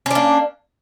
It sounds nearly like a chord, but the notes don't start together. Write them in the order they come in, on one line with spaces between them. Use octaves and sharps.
C#4 D4 A#3